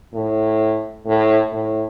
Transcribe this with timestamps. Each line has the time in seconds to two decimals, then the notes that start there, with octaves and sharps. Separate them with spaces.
0.14 A2
1.06 A2
1.52 A2